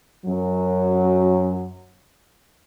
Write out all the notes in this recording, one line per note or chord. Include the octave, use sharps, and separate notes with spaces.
F#2 F#3